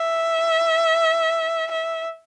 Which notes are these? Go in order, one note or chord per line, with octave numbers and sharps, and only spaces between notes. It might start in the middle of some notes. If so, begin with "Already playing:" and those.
Already playing: E5
E5